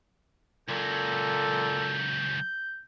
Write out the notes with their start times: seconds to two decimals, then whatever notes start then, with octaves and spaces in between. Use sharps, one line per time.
0.69 C#2 A#2 F#3 A4 G6